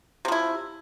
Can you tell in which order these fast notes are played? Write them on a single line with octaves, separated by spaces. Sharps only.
C3 F3 E4